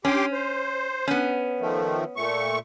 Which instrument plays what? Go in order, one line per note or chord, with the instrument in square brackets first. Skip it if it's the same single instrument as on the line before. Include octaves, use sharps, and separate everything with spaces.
[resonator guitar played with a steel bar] C#4 [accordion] G4 C6 D6
[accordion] C5
[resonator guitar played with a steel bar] B3 C#4
[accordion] D#3 F3 A3
A#2 A3 C#6